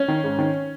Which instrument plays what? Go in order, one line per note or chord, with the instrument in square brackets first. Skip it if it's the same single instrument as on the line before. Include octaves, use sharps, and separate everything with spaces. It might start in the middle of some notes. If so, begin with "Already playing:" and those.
Already playing: [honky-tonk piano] C#4
D#3
G#2
D#3